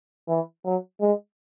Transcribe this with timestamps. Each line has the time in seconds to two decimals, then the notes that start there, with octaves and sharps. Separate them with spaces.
0.29 E3
0.65 F#3
1.01 G#3